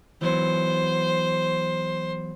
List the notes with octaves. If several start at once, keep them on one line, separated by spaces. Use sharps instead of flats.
E3 F#3 B3 C5